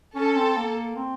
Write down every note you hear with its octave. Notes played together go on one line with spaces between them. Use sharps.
C#4 A4
C4
A#3
C4